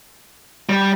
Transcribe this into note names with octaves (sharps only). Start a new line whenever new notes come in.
G3